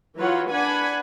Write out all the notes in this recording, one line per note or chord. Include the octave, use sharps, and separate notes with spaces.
E3 F#3 F4 B4 C#5 F#5
D4 B4 F#5 G#5 B5